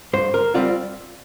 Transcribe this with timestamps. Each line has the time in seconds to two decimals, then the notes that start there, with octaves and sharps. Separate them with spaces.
0.13 G2 C5
0.34 A#4
0.54 G3 C4 F4 D5